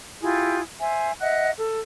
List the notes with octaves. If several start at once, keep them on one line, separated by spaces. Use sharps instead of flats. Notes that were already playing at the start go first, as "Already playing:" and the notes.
E4 F4 G4 G#4
C5 E5 G#5
D#5 E5 F#5 F#6
A4